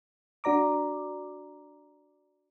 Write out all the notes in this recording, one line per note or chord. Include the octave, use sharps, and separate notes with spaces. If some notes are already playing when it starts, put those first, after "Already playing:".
D4 F#4 D5 A#5 D6